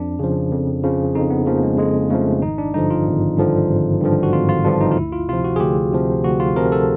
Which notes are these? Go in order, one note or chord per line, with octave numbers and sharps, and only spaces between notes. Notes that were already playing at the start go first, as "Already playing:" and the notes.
Already playing: F2 D4
C#3 F3
F2
C#3 F3
F2 D#4
B3
C#3 F3 A#3
G#3
F2 G#3
C#3 F3 A3
G#1 D#4
D4
G2 D3 F3 D#4
F4
G#1
G2 D3 F3
G#1
G2 D3 F3
F#4
G#1 F4
F4
G2 D3 F3 D4
D#4
F4
D2 E4
F4
C3 F3 F4
F#4
G#4
D2 G4
C3 F3
D2 F#4
F4
C3 F3 A#4
A4